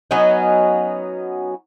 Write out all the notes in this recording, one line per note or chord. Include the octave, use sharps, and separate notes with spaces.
F#3 B3 C#4 D#4